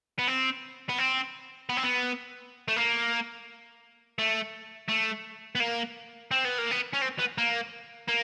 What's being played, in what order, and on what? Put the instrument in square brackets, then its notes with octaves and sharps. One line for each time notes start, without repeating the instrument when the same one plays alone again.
[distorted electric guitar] B3
C4
B3
C4
B3
C4
B3
A3
A#3
A3
A3
B3
A#3
C4
B3
A#3
B3
C#4
C4
B3
A#3
A#3